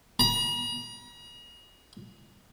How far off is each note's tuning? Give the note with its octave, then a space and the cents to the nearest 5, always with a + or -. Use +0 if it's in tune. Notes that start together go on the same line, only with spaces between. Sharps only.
A#5 +45